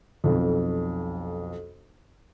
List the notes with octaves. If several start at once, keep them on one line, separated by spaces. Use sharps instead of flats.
B1 F2